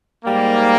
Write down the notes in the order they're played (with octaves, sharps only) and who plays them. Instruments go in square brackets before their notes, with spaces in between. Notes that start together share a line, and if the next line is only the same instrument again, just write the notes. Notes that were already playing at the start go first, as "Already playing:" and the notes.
[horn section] G#2 G3 A#3